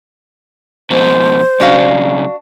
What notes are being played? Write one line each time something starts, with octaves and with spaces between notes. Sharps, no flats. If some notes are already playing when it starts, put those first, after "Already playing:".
F2 B2 C5
B1 C#3 D4 F#4 F5